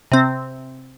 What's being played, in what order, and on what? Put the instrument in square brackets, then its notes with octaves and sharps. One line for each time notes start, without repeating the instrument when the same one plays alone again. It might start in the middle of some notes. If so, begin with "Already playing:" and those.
[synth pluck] C3 C4